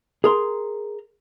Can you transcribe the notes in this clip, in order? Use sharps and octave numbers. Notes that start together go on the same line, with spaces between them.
G#4 A#4 C6